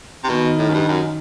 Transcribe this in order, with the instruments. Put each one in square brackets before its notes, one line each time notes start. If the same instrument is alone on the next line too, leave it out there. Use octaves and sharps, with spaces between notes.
[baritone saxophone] C3
[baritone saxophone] B2 [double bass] D#3
[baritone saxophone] A2
F#2
G2
F#2